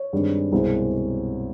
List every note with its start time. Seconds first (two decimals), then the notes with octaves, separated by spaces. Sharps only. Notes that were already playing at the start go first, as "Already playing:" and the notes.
Already playing: C#5
0.13 G2 D#3 G#3 C4
0.51 C2 B2 G#3 C4